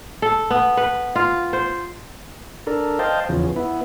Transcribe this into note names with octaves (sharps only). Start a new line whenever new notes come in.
A4
B3
B4
F4
C5
D4 A4 A#4
C5 D#5 F5 G5 A5
E2 C#3 F3
B3 E4